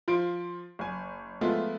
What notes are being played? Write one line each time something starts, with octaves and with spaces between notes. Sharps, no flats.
F3 F4 C6 D7
F#1 G#5
F3 G#3 A3 B3 E4 F4